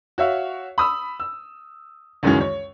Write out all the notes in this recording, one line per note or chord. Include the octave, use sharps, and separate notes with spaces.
F#4 C#5 E5 F5
B5 D#6 E6
E6
C#2 F#2 D#3 E3 G#3 C#4
C#5